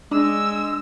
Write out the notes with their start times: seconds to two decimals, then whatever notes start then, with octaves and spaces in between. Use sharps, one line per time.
0.11 G#3 D4 E6